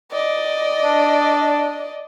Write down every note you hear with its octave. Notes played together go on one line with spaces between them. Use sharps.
D5 D#5
D4